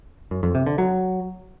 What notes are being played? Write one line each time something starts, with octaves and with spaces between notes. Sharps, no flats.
F#2
F2
C3
D3
F#3